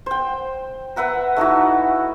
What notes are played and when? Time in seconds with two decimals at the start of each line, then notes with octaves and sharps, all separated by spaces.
0.06 C5 G5
0.96 B4 E5 F#5 A#5
1.36 A3 D#4 E4 F#4